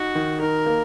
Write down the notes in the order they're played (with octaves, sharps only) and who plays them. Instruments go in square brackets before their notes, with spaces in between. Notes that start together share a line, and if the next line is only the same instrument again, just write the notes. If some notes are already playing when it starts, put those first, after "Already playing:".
Already playing: [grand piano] D#4 [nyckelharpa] F#4
[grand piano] D#3
[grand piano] D#4 [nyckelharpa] A#4
[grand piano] A#3